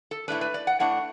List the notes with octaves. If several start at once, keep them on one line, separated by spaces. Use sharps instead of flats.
A4
A2 A3 D4 B4
B4
D5
F#5
A2 A3 D4 F#5